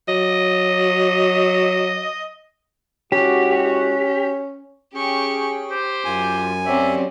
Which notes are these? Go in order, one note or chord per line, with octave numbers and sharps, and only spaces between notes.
F#3 D#5
G#3 C#4 E4 F#4 G4
C#4 G4 G#4 G5 C#6
G4 C5
F#2 F4 G#5
F#3 C4 C#4 G4 D5 E5